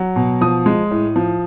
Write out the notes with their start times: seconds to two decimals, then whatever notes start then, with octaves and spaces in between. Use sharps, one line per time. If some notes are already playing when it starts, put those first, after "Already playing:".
Already playing: F#3
0.16 B2
0.41 F3 D#6
0.66 G#3
0.91 A2
1.16 F3